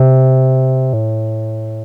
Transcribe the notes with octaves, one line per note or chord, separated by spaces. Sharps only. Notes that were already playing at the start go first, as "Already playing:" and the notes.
Already playing: C3
A2